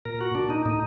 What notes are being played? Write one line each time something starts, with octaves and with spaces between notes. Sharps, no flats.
A#2 A#4
F#4
A#2 D4
D#4
A2 D#4